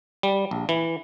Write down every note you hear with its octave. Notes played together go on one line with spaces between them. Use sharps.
G3
A#1
E3